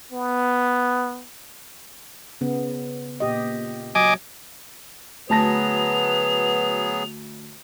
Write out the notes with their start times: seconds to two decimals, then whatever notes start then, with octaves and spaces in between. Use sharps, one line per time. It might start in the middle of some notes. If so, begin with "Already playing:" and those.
0.12 B3
2.41 C#3 B3
3.20 A#2 G4 D#5
3.95 F#3 D#5 G#5 D6
5.29 D2 F#3 B3 G#4 B4 A5 A#6 F7